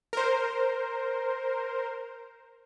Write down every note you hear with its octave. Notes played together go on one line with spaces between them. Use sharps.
A#4 C5